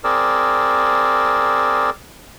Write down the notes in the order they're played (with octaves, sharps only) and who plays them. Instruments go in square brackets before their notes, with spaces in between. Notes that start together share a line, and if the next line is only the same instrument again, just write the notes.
[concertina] C4 G#4 A#4 D5 E6